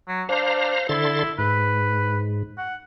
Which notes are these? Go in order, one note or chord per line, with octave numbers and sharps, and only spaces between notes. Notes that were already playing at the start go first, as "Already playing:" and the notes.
F#3
D4 C5 F5 A#5
D3 E4 C6 A6
G#2 B4
F#5